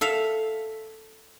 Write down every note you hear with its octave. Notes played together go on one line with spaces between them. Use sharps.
A4 E5 F5